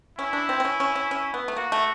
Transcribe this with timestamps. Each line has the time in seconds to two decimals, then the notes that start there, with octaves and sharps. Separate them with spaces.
0.18 C#4 E4
0.33 D4
0.49 C4
0.60 C4
0.65 C#4
0.80 C#4
0.95 C#4
1.11 C#4
1.34 B3
1.48 A3
1.56 A#3 F#4
1.72 A3